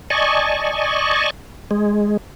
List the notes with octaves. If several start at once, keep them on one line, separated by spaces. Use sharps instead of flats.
D5 D#5 G#5 A5 C#6
G#3